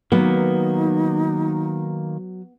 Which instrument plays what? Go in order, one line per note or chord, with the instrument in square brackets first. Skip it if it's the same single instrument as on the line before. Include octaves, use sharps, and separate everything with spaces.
[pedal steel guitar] D#3 A#3 [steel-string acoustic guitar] F#3 [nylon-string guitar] B3 [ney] D#4